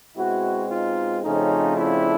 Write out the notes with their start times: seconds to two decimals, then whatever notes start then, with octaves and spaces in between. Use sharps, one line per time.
0.16 B2 G#3 C4 E4 F#4
0.71 D#4 F4
1.23 F2 C#3 F3 A3 C4 C#4 D#4
1.77 D4 E4